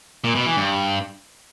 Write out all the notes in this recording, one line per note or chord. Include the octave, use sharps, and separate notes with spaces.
A#2
B2
E3
G2